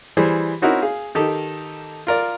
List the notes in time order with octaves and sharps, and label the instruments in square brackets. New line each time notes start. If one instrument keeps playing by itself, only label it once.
[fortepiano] E3 G3 G#4 C5
C4 C#4 D#4 E4 F#4 A#4
G#4 F5
D#3 D#4 G4 A4
F4 A#4 D5